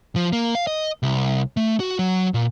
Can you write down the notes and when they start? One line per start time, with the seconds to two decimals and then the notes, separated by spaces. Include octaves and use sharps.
0.16 F3
0.33 A#3
0.55 F5
0.67 D#5
1.03 C2
1.57 A3
1.80 F#4
1.99 F#3
2.34 A#2